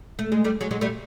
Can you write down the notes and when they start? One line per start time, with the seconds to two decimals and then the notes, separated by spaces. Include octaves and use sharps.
0.19 A3
0.32 G#3
0.44 G3 A3
0.61 F#3 G#3
0.71 F#3 G#3
0.81 G3 A3